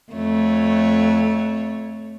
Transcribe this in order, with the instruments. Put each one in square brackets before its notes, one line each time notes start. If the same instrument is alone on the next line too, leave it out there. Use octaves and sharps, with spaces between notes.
[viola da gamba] F2 A3 C#5